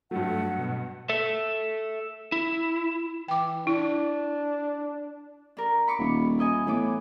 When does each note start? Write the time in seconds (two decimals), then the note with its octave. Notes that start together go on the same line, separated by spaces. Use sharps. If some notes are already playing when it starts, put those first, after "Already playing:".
0.11 G2 F#3 A3 F#5
0.58 B2
1.09 A4 E5
2.32 E4
3.28 E3 G5 D6
3.67 D4 E4
5.57 D4 A#4
5.88 B5 C#6 D6
5.99 D#1
6.39 E4 D#5 G#5
6.67 A2 E3 B3 D6